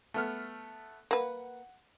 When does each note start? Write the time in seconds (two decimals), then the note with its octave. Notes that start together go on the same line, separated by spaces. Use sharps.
0.14 A3 B3 F6
1.11 A#3 B4 F#5